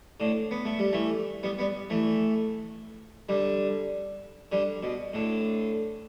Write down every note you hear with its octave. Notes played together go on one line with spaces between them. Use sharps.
A2 D3
B3
A3
G3
E3 A3
G3 B3
G3 B3
E3 A3
D3 G3
D3 G3
B2
A2 D3